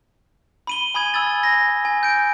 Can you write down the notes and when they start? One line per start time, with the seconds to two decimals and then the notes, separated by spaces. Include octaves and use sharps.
0.67 B5 D#7 G7
0.94 G#5 B5 D#6 G#6 D#7
1.14 G#5 B5 E6 G#6 A6
1.43 A#6
1.85 G#5
2.03 G6 D7